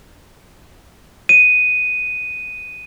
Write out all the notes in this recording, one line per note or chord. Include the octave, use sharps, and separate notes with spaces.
D#7